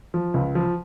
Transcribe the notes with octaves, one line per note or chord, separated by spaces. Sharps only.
F3
C#2
F3